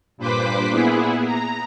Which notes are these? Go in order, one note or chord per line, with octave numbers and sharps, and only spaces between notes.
G2 A#2 B4 C5 D6 B6
A#2 B3 E4 G#4
A#5